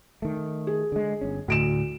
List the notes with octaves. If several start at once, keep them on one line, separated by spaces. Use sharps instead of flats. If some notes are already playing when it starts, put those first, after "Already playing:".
D#3 A3
G#4
D3 G#3
G1 C#4
D2 A2 D7 E7